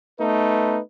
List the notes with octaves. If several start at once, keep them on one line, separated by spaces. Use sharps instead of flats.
A3 B3 D#4 B4